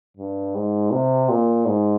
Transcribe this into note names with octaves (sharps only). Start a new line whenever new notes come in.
G2
G#2
C3
A#2
G#2